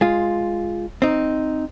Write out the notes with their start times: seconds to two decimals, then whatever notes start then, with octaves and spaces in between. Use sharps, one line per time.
0.01 G#3 F4
1.02 C4 D#4